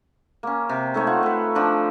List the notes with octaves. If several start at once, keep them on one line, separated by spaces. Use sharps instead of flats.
A#3 C#4
C3
A3 D#4 C5 C#5
F4 F#5
A3 B4
F3 D4 B5